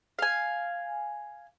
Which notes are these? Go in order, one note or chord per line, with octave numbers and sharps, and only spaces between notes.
F5 G#5